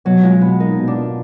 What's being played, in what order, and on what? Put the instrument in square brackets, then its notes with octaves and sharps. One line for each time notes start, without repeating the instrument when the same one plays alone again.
[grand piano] B2 [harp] F#3
[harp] G#3 [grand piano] F4
[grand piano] B2 [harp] B3
[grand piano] A#3 [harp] D#4
[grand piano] B2
[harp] D4
[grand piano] F4